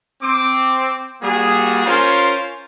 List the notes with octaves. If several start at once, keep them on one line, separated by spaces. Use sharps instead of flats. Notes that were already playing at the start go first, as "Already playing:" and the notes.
C4 D6
G3 A#3 F#4 G#4
C#4 F4 A#4 C5 C#5